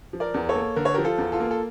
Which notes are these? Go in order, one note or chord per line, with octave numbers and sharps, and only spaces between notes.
F3
A#4 D5
E2
A4 C#5
A#3
D3 A#4
C#5
F3 G4 A#4
F4 A4
E2
F4 A4
A#3
A4